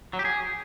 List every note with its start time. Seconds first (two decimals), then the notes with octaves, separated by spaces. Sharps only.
0.13 F#3
0.19 G4
0.25 G#4